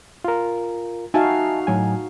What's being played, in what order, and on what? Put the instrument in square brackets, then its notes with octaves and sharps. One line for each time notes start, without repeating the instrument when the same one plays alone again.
[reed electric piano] F4 A#4
[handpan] D#4 F#4 F5 [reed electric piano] E5 G#5 A5
[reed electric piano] A2 F#3 G#5